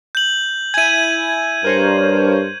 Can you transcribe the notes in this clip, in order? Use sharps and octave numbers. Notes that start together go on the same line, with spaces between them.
G6 F#7
E4 G#5 G#6 D#7
G2 A#4 C5 C#5